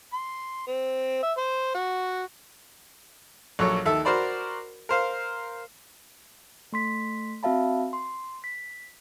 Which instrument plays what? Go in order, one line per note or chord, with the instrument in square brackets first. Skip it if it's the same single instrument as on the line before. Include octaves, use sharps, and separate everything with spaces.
[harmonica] C6
C4
E5
C5
F#4
[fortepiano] A#1 F#3 A4 C#5
D#2 A4 E5
F#4 A#4 C5 D5 B5
A#4 C5 F5
[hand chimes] A3 C6 B6
C4 F#4 E5 F5 A5 B5
C6
B6